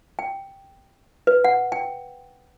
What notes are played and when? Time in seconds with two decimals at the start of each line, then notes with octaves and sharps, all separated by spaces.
0.19 G5
1.27 B4
1.44 F#5
1.72 G5